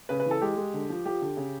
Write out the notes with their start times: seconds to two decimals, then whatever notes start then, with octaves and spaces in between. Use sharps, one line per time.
0.09 C#3 B4
0.20 B4
0.26 E3 A4
0.42 G#3 G4
0.57 G#3
0.74 D3
0.90 F3
1.05 F3 G4
1.21 D3
1.37 C#3